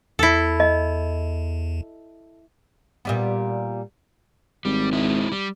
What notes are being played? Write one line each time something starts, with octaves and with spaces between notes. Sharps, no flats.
E2 E4 A4
D#5
A#2 G3 B3
G#1 G3
G#3 E4
G3